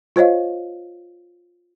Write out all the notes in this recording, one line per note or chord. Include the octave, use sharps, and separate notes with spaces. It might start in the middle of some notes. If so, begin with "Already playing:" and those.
F4 C5 C#5 D#5 F5